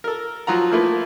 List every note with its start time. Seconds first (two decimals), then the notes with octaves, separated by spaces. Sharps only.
0.04 A4 A#4
0.47 F3 F#3 F4 F#5 A#5
0.71 F3 A3 A#3 E4 F4 B4